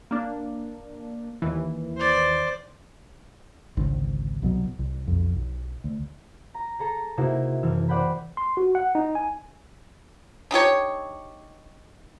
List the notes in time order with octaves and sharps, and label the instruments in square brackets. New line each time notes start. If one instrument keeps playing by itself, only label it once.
[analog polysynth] A#3 D4
D#2 E3
[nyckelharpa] C5 D5
[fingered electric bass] G#1 C#2 G#2 D3
C2 B2 F3 F#3
C2
B1 F2
B1
D2
[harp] A#5
G#4 A4 A#5 C#7 E7
C3 A#3 D#4 E4 F#4 G#4
F#1 E3 E6 F6 G#6
C5 D5 F#5 G5 B5
[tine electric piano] C6
F#4
F#5
D#4
G#5
[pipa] D4 D#4 G4 C#5